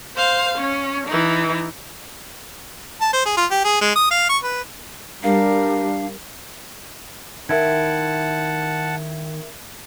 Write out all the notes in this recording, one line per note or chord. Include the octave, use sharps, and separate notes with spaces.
C5 F5
C#4
E3 D#4
A5
C5
G#4
F4
G4
G#4
G#3
D#6
F5
C#6
B4
G3 D4 A#4 F5
D#3 E4 A#4 E5 F#5 G5 A5 G#6